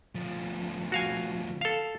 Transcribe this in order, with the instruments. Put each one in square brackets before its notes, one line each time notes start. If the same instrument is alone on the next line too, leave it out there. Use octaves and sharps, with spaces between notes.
[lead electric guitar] D2 F3
[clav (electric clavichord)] F#4 F5 G#5
A4 F5